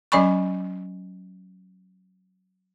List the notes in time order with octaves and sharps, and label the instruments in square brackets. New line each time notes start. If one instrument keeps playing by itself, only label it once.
[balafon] F#3 C#4 D5 G#5 B5 C#6